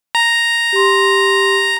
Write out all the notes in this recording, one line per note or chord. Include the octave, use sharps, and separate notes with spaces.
A#5
G4 C6